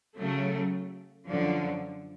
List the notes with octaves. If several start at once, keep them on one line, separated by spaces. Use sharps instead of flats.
C#3 F#3 A3
F#2 D3 F3